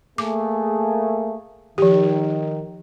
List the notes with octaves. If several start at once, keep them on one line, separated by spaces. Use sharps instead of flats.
A3 A#3 G#4 D6
D#3 F3 G4